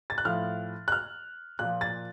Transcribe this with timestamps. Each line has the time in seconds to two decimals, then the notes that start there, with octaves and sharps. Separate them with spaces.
0.10 A6
0.18 F#6
0.25 A2 F3 F6
0.88 F#6
0.92 F6
1.59 A#2 F3 F#6
1.81 A6